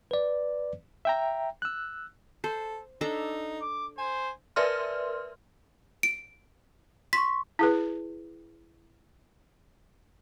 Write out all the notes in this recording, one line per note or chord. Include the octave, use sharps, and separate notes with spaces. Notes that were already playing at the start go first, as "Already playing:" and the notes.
B4 D5
E5 G5 A#5
E6 F#6
A4 C5
D4 D#4 A4 A#5
D6
C5 G#5
A#4 B4 D5 E5 C6 F6
D7
C6 C#6 B6
E4 G#4 B4